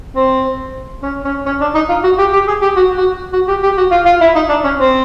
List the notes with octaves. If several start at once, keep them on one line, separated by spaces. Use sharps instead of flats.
C4
C#4
C#4
C#4
D4
D#4
F4
F#4
G4
G4
G#4
G4
F#4
F#4
F#4
G4
G4
F#4
F4
F4
E4
D#4
D4
C#4
C4